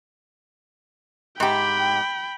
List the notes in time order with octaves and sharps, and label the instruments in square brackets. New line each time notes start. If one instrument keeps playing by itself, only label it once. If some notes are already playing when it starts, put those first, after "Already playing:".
[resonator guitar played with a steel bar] G#2 G4 [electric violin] G5 B5